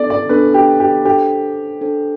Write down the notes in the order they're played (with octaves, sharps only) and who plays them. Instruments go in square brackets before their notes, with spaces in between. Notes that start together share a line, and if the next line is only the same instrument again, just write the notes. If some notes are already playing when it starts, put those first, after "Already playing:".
Already playing: [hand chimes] B3 D4 A4 [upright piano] D5
[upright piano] D5
[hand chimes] B3 D4 A4 [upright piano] B4
[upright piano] G4
G4
[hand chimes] D4 A4 C5 [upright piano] G4
[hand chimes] D4 A4 C5